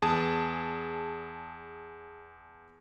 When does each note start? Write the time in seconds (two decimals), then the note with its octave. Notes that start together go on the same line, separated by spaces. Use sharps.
0.02 E2 G#4 A5 D#6